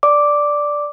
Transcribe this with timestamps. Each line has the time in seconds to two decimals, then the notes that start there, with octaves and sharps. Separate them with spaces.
0.03 D5 D6